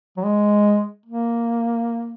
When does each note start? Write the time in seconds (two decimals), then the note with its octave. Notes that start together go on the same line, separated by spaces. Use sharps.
0.17 F#3
0.25 G#3
1.06 A#3